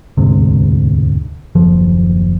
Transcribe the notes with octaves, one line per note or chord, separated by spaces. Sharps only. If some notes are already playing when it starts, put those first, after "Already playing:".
E1 D2 G#2 C3
F#1 D#2 F3